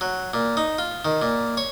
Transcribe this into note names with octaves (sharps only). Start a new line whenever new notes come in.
F#3
A#2
D#4
F4
D#3
A#2
C#5